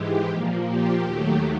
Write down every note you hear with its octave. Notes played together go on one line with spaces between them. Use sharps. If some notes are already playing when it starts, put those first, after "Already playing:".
Already playing: G#2 E3 G#3 G4
A#2 F3 A#3
G4
D#2 D#3 F#3 A3